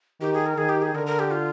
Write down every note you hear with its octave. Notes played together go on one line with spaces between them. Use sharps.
D#3 G4
G#4
A#4
D#3 G#4
G4
G#4
D3 A#4
A#4
G4
F4